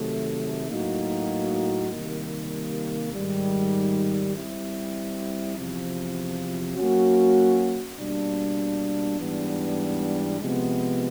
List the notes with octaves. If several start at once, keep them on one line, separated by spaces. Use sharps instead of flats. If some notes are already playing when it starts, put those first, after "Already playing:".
Already playing: C3 D#3 F#3 A3
A2 F#3 A#3 D#4 F#4
C3 D#3 G3 A#3
G#2 D#3 G3
G3 C4 E4
E2 C3 F3
F#3 A#3 C#4 F#4
B2 G3 A#3 D4
G#2 E3 G3 B3 D4
C3 F3 G#3 B3